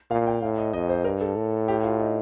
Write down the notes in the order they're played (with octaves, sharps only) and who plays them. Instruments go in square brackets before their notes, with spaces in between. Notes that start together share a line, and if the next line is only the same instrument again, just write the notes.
[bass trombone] A#2 [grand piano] F5
[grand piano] G5
[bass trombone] A2 [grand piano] F5
[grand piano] D#5
[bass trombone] F2 [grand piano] D#5
[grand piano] C5
[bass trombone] G2 [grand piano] A#4
[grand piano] A4
[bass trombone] A2
[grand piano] G4
F4
D#4